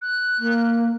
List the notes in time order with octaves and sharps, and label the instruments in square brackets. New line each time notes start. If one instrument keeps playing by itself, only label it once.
[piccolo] F#6
[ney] A#3